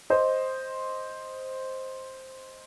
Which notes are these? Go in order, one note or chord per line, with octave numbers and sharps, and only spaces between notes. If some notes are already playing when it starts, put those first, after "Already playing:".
C5 D#5